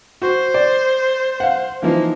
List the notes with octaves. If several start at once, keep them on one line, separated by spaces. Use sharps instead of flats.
F#4 C5
D5
F5 F#5
E3 F3 A#3 D#4